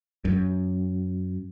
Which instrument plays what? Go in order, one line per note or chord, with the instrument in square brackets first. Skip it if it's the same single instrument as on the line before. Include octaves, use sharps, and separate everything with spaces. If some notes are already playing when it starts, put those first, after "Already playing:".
[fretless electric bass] F#2